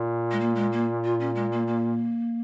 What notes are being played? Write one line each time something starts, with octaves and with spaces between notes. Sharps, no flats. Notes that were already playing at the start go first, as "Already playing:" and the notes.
Already playing: A#2
G#3
A#3
G#3
A#3
F4
C#4
G#3
A#3
A#3